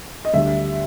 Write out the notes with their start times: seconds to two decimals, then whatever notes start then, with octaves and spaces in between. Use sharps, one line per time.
0.25 D#5
0.33 D2 D3 G3 E5